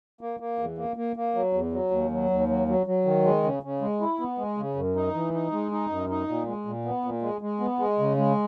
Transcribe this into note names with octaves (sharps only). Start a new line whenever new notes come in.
A#3
A#3
E2
A#3
A#3
A#3
F#3
E2
F#3
D#2
F#3
D#2
F#3
F#3
F#3
D#3
G#3
C#3
C#3
G#3
E4
B3
G#3
C#3
F#2
D#4
E3
D#4
G#3
D#4
F#2
D#4
A#2
G#3
A#2
B3
A#2
G#3
G#3
B3
G#3
C#3
G#3